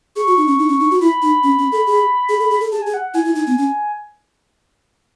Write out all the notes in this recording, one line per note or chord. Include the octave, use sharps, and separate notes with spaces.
G#4 C#6
F#4
D#4
C#4
D#4
C#4
D#4
F#4
E4 B5
D#4
C#4
C#4
A4
G#4
G#4
A4
G#4
A4
G#4 A5
G#4 G#5
F#5
F#5
E4 G#5
E4
D#4
B3
C#4